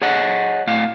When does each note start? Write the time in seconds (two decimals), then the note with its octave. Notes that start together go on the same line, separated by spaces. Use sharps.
0.02 G#4 C#5 D#5 F#5
0.67 A2 F5